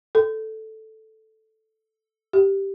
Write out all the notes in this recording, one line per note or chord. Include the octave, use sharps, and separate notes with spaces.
A4
G4